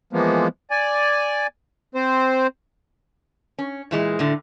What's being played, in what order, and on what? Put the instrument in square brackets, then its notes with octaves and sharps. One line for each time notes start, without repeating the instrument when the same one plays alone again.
[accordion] E3 F3 G#3 A#3 B3
D5 G#5
C4 C5
[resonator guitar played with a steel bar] C#4
A#2 E3 G#3
A2 D3